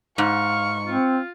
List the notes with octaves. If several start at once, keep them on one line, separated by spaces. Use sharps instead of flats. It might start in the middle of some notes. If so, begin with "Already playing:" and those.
G#2 F5 C#6
C4 F4